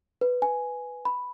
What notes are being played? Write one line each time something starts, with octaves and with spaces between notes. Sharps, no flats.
B4
G#5
B5